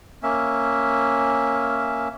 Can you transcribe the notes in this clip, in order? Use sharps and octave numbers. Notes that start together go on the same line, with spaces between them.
A#3 C#4 E5